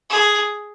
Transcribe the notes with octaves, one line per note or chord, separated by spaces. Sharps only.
G#4